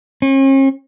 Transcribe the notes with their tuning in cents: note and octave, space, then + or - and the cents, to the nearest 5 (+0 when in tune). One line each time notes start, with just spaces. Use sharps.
C#4 -45